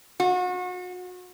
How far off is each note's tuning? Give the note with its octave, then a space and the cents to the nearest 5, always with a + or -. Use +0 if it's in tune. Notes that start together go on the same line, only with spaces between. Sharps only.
F#4 -35